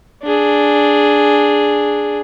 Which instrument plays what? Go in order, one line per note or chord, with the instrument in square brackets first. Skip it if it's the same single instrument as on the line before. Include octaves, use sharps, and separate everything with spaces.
[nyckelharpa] D4 G#4